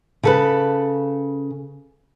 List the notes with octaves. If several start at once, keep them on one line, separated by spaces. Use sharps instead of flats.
C#3 A4 B4